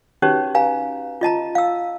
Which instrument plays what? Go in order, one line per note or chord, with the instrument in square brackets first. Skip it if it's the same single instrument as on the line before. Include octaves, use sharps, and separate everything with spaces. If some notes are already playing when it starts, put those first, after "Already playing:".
[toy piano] C#4 D#4 F#4 G4 B4 C#5
B4 F5 G#5 A#5
F4 D#5 A5 A#5
F5 E6